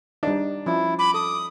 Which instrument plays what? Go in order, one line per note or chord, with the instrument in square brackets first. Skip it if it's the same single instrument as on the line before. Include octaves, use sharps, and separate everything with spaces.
[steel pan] G3 D#4 [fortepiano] D4
[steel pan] F3 C#4 [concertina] E4
[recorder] B5 [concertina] D6
[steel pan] A4 [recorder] D#6